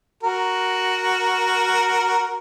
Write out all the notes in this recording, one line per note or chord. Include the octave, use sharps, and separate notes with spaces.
F#4 A#4